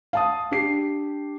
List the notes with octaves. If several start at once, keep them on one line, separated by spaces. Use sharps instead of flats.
F5 A5 D#6
D4 G4 C7